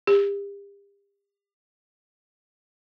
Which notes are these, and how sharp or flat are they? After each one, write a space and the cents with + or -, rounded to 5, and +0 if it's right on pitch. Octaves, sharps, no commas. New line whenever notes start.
G4 +40